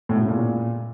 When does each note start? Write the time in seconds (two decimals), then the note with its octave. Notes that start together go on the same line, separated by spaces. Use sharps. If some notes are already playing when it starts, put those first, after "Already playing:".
0.09 A2
0.16 B2
0.22 C#3
0.28 A#2